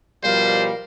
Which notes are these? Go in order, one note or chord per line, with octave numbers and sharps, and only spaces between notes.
B2 F3 G3 A#4 C5 F5